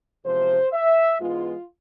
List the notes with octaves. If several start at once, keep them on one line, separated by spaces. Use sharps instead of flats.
E2 C3 F3 G#3 C5
E5
G#2 E3 G#3 B3 F4